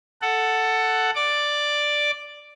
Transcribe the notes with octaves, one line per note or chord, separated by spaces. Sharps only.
A4 F#5
D5 D6